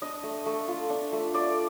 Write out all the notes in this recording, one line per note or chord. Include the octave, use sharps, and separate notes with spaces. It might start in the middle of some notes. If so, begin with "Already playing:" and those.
D4 D#5
A3
A3
F4
D4
A3
A3 D5